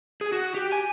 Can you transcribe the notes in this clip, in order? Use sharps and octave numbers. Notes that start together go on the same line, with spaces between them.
G#4
F#4
G4
G#5